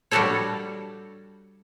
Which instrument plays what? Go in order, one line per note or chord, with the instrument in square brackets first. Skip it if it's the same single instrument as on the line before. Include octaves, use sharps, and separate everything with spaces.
[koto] G3 D4 F#4 G4 A4 C#5